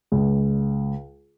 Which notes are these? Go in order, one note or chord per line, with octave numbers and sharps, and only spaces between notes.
C#2